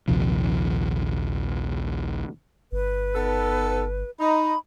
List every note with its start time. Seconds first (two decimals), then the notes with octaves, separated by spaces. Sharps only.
0.08 A#1 D#2 C3 F3
2.72 G1 B4
3.14 B3 D#4 A4
4.20 D#4 B5